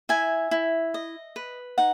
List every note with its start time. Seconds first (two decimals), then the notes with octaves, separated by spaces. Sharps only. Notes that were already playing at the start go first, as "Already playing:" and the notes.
0.09 E4 E5 G#5
0.51 E4
0.94 D#5
1.36 B4
1.78 D#4 F#5